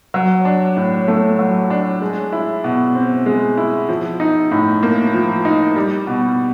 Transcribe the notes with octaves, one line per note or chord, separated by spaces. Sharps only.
F#3
D4
A2
A3
F#3
D4
G#3
E4
B2
C4
G#3
E4
F3
D#4
A2
A#3
F3
D#4
G3
B2